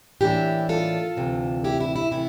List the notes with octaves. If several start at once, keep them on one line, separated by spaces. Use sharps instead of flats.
A2 E3 A#3 D4 E4 G4
F4 A4
D2 C3 E3
E4 G4
E4
E4
C3 E3 A3 E4